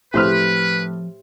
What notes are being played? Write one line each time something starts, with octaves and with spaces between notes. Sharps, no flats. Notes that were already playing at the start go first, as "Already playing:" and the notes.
A2 F3 C4 G4 B4 C5 F6